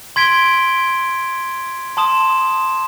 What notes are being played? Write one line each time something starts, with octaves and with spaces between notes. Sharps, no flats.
C6 G#6 B6 D7 G7
A5 C6 D#6 E7